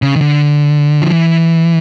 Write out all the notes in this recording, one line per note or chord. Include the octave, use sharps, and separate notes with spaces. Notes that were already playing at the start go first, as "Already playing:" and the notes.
C#3
D#3
D3
F3
E3